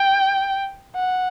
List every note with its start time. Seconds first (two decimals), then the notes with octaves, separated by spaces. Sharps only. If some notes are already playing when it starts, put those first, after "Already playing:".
Already playing: G5
0.95 F#5